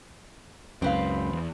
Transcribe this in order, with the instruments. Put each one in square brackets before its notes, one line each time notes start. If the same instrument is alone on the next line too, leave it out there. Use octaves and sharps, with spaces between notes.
[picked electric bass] C#2 F#2 [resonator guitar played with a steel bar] C4 B4 F5
[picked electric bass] E2